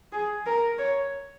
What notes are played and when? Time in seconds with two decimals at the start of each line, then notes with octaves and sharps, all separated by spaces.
0.12 G#4
0.46 A#4
0.78 C#5